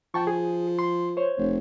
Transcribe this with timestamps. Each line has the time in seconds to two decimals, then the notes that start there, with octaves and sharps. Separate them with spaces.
0.14 F3 G5 A5 C#6
0.27 G#4
0.79 C6
1.17 C5 C#5
1.38 F1